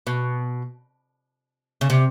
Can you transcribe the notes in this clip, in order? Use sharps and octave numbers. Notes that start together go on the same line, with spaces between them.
B2
C#3
C3